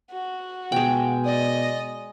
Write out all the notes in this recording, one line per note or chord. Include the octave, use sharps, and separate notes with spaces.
F#4
B2 G#3 G5
D5 D#5